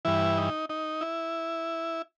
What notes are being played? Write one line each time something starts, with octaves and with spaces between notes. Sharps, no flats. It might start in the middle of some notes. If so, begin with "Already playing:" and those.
G2 E3 E4
D#4
D#4
E4